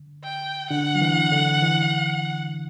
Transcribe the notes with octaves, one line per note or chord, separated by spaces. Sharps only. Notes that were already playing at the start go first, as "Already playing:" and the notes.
Already playing: D3
G5
D3 D4 F#5
F#3
E3
D3
E3